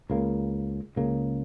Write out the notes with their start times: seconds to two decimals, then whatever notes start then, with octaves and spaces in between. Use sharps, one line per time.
0.10 C#2 C#3 A#3
0.96 C#2 C#3 A#3